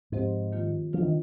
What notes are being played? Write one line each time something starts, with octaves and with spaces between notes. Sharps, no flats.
G#2 F3 C4 G4 C5
F2 D#3 A#3 F4
C3 F3 G3 D4 F4 C5
D#3